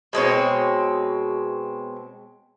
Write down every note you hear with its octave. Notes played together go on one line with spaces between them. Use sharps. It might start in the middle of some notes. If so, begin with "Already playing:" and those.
B2 G#3 C4 C#5